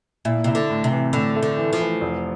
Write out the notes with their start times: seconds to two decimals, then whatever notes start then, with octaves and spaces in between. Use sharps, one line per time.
0.25 A#2 E4
0.44 C3 E4
0.55 D3
0.70 A2
0.84 C3
0.91 E3
1.13 A2 D3
1.35 A3
1.43 D3
1.57 E3
1.73 F3
1.80 E3
2.01 F1